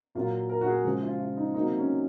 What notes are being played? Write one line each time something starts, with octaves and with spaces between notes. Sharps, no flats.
A#2 F#3 A#3 F4
A#4
F#4
G#4
C#3 F3 G#3 G#4
F4
F4
D#4
C3 F#3 A#3 D#4
C#4